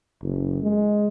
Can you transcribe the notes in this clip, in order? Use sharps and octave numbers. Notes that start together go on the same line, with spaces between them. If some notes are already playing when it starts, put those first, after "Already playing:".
F#1
G#3